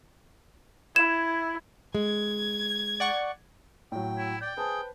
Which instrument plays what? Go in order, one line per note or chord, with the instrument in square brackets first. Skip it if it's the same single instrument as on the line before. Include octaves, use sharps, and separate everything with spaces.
[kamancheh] E4 [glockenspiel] G#6 [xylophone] E7
[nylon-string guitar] G#3 [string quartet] G#6
[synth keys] D5 F#5 C#6
[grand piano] A2 F#3 [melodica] G5
[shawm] E4
[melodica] D5 [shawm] G5
[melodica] G#4 [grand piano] B4 C5 A5